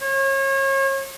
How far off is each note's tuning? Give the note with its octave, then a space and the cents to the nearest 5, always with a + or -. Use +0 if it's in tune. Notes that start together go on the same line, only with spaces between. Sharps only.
C#5 -35